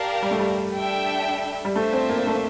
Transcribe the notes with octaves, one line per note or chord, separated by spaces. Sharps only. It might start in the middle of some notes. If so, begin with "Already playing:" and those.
Already playing: G4 A#4 D5 F5 A5
G3
A3
G3
D4 A4 E5 G5
G3
A3 D4 F4 C5 E5 A5
C4
A#3
A3